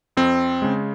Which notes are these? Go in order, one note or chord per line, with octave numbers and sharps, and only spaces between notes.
F2 C4
C#3 G#3